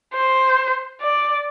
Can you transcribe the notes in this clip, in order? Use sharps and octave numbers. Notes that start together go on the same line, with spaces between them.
C5
D5